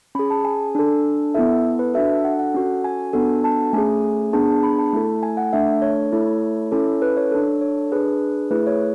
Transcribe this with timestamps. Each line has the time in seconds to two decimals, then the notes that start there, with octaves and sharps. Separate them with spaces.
0.15 C#4 G#4 B5
0.30 A5
0.45 G#5
0.75 D4 A4
1.34 B3 E4 A4 E5
1.79 B4
1.94 D4 F#4 A4 E5
2.24 F#5
2.39 F#5
2.54 C#4 F#4 A4
2.84 G#5
3.13 B3 D4 F#4 A4
3.44 A5
3.73 A3 C#4 G#4 G#5
4.33 B3 D4 G#4 A5
4.63 B5
4.79 A5
4.93 A3 E4 A4
5.23 G#5
5.37 F#5
5.53 A3 D4 A4 E5
5.82 C#5
6.12 A3 E4 A4
6.72 C#4 E4 A4
7.02 B4
7.17 C#5
7.31 D4 A4
7.61 C#5
7.92 D4 G#4 B4
8.51 A3 E4 G#4 B4
8.67 C#5